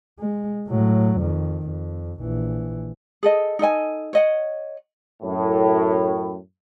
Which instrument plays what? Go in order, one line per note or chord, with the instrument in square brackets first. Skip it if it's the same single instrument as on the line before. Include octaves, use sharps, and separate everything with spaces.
[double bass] G#3
A2 F#3
F2 D#3
F2
A#1 E3
[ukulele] G#4 A4 D#5
D#4 A4 D#5 G#5
C#5 D#5 F#5
[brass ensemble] F#2 A2